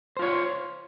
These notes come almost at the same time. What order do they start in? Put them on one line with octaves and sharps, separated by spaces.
C5 F4 C#5